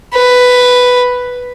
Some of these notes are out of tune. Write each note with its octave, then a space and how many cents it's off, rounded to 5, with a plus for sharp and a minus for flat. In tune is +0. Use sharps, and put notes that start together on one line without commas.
B4 +5